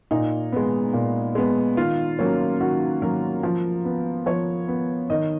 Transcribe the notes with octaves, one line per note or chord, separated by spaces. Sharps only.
A#2 D#4
G#3 B3
A#2
G#3 B3
D#3 F4
F#3 A#3 C#4
D#3 F#4
F#3 A#3 C#4 A#4
F3
B3
F3 C#5
B3
D#3 D#5